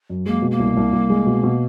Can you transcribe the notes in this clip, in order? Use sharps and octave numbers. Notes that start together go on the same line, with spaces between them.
F#2
G#3 A#3
B2
A#3
C2
C2
C2
G#3
B2
B2